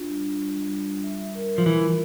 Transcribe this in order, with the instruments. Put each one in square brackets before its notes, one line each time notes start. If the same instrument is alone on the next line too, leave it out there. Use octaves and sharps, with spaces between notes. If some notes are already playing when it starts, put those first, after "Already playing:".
Already playing: [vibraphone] D4 F4
G3
D4
G3
G3
G3
G3
E5
E5
A#4
A#4
[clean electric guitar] F3
[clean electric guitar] E3 [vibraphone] E5
[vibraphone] F4